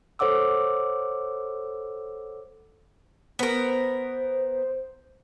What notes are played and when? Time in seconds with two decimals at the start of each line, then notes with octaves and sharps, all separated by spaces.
0.19 A4 C5 C#5 F#5 D6 E6
3.39 B3 A#4 C5